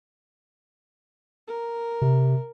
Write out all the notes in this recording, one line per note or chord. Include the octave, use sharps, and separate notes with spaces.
A#4
C3